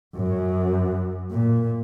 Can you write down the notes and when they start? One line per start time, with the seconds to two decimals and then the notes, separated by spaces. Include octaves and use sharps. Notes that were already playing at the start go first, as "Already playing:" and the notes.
0.16 F#2
1.31 A#2